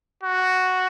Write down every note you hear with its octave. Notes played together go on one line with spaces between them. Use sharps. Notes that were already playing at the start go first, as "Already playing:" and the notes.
F#4